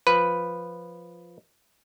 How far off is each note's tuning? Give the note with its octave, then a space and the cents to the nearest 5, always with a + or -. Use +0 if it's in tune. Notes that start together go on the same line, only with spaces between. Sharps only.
F3 +0 B4 +0